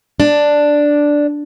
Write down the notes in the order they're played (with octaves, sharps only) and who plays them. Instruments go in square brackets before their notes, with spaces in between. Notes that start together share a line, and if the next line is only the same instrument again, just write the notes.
[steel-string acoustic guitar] D4